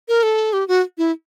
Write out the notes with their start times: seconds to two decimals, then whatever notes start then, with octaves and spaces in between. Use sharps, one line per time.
0.08 A#4
0.23 A4
0.53 G4
0.68 F#4
0.98 E4